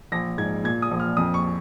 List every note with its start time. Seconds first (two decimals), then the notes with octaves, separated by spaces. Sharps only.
0.12 A#1 A#6
0.38 G#2 G#6
0.64 A#2 G#6
0.82 D#6
0.91 A#1
1.00 F6
1.17 F2 D#6
1.34 C#6